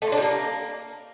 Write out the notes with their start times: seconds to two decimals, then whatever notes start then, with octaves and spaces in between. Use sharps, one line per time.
0.02 A3
0.07 F4
0.12 D4
0.17 G3
0.23 A#3